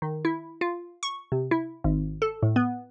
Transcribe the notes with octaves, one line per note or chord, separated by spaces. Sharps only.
D#3
E4
F4
C#6
C3
E4
G#1
A4
A2
B3